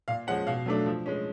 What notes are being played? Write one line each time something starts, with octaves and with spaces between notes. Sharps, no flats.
A#2 F5
F3 G#3 C#4 F#5
B2 F5
F#3 A3 D4
F3
G#3 C#4